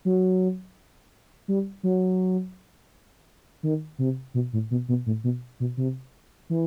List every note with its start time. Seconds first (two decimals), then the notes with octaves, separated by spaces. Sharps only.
0.05 F#3
1.48 G3
1.83 F#3
3.63 D#3
3.99 C3
4.34 B2
4.53 A2
4.71 B2
4.88 B2
5.06 A2
5.24 B2
5.60 B2
5.77 C3
6.50 E3